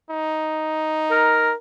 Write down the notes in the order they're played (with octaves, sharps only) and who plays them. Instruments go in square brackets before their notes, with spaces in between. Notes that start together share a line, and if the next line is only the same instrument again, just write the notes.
[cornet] D#4
[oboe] A#4